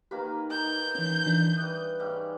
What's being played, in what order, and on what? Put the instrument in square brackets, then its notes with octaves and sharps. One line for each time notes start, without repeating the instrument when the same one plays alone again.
[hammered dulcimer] D#3 A#3 B4 [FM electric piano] G4
[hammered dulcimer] D#4 [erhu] G6
[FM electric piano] E3 C#4
E3 D4 E4
[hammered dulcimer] E3 G3 [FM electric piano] D#6 F#6
[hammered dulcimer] G#2 C#3 G3